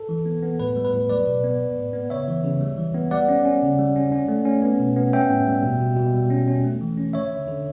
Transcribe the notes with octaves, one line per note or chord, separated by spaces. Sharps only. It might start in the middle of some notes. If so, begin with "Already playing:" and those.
Already playing: A4
E3
B3
B3
A2 B4
G3
B4
A2
F#3 B4 D5
B2
B3
B3
A2
B3
C#3 C#5 E5
E3
C#3
G3
E3
B3
G3 D5 F#5
C#4
C#4
C#3
G3
C#4
C#4
A3
C#4
B3
B2
B3
C#4 E5 G5
A2
G3
B2
B2
B2
G3
C#4
C#4
A3
E3
C#4
D3 C#5 E5
D3
D3